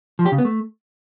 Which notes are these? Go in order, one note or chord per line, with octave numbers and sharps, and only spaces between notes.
F3
G4
C#3
B3
A3